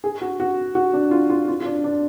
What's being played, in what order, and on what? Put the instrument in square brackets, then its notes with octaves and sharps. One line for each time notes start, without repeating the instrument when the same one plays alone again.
[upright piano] G#4
F#4
F#4
F#4
D4
F4
F4
F4
F4
D4
D4